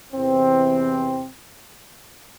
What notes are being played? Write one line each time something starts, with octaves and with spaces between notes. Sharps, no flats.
E2 C3 E3 C4